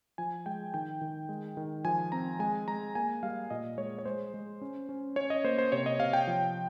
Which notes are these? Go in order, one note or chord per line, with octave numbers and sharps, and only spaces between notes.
F3 G#5
G#3 G5
D#3 G5
D#3
G#3
D#3
F3 G#5
C4 A#5
G#3 G#5
G#3 A#5
A#3 G#5
G3 F5
A#2 D#5
G#3 C#5
C#5
G#3 C5
G#3
C#4
C#4
C#4 C#5
D#5
A#3 C5
C5
C3 C#5
D#5
C3 F5
G5
F3